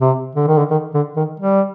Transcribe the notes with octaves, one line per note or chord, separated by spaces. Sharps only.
C3
D3
D#3
D3
D#3
D3
D#3
G3